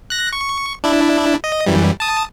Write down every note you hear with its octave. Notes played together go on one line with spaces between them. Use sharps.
F#6 A#6
C#6
D4 E4
D#5
F#2 E3 G3
A5 D#6